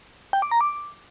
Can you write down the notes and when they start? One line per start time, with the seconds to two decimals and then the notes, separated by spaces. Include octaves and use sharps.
0.33 G5
0.42 D6
0.51 A#5
0.61 D6